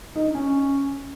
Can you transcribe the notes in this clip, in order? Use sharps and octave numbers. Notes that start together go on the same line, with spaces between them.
D#4
D4
C#4